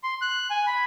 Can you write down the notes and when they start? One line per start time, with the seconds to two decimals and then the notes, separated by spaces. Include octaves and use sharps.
0.03 C6
0.21 F#6
0.50 G#5
0.67 B5